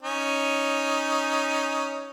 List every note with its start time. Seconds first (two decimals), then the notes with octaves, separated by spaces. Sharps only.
0.02 C#4 D#4